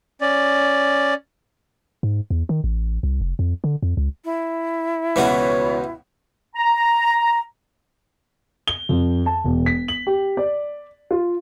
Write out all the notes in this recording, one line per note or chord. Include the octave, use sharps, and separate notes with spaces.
C#4 D5
G#2
E2
D#3
A1
C2
F1
F2
D3
F2
C#2
E4
C#2 B2 E3 B3 C#4 F#4 C#5
A#5
G7
F2
A5
E1
B6
F#7
G4
D5
F4